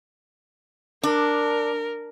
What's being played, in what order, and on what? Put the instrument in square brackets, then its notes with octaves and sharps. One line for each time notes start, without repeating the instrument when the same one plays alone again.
[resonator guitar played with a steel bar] D4 [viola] A#4